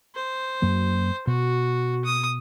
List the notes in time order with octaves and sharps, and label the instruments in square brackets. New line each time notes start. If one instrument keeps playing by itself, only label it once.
[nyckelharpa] C5
[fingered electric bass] F#2 F#3 A#3
[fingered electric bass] B2 [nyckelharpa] F#4
[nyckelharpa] D#6